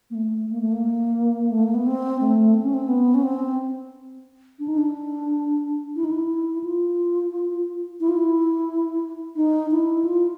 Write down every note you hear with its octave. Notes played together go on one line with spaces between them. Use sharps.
A#3
A3
A#3
A3
A#3
A3
A#3
B3
C4
A3
C4
C#4
C4
B3
C#4
C4
D4
D#4
D4
E4
D#4
E4
F4
E4
F4
E4
D#4
E4
F4